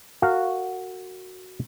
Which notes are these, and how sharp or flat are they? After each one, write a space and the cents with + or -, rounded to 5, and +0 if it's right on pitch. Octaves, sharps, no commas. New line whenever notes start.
F#4 +0 A#4 -35 F5 +0